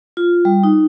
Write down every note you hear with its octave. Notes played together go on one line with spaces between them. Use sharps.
F4
G3
D#4